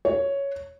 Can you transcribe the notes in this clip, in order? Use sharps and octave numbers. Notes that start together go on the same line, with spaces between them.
C#5